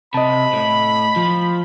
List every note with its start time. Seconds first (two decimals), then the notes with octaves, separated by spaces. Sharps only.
0.14 C3 D#5 A5 B5
0.53 A2
1.16 F3